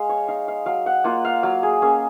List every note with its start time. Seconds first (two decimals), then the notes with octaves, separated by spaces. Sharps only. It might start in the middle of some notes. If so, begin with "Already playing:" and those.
Already playing: G#3 F5
0.09 C#5
0.28 D#4 F5
0.48 F5
0.66 F#3 F5
0.86 F#5
1.04 A#3 F4 F#5
1.25 F5
1.43 F#3 F5
1.63 G#4
1.82 A#3 C#4 G#4